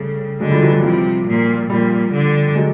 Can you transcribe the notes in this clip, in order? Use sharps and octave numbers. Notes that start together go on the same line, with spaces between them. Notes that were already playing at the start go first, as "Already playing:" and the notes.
Already playing: C#3 G3 A3
D3 F#3 G#3
F3 G3
E3 F#3
E3 F#3
C3 F3 G3
A#2
A#2 F3 G3
D3
F#3 G#3